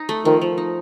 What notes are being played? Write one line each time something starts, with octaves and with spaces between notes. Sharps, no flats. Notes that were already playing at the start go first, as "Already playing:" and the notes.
Already playing: D#4
A3
D#3 F3
F3
D#4